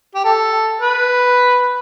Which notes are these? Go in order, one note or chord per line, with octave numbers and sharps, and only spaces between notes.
G4
A4
B4